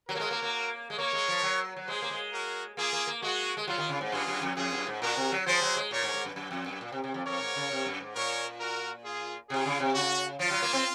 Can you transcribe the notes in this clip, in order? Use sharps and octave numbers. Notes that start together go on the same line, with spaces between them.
F#3 F#4 A#4
A#3
G#3
A#3
A#3
G#3
A#3 A#4 C#5
G#3
F3
F#3
F#3
G#3 G#4 C5
A#3
G#3
F#4 A#4
A#3 F4 G#4
A#3
A#3
G#3 F#4
G#3
F#3 F4
D#3
C#3
G#2
F#2 F4 G#4
F#2
F2
F2 F4 G#4
F#2
G#2
A#2 F#4 A#4
C3
F#3
F3 G#4 C5
F#3
G#3
A#2 A#4 C#5
G#2
G#2
F#2
F#2
F2
F#2
A#2
C3
C3
F2
F2 A#4 C#5
G#2
C#3
C3
F#2
G#2
A#2 A#4 C#5
F#4 A#4
F4 G#4
C3 F4 G#4
C#3
C3
C#3 F#4
F3 F4
F#3
A#3
C4